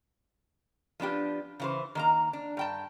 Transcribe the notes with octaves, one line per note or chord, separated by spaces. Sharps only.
F3 B3 D4 G4
C#3 E3 C5
D#3 A#3 A#5
D4
G2 G5 A5